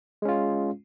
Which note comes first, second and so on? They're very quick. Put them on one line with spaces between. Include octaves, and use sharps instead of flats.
G#3 C#4 F4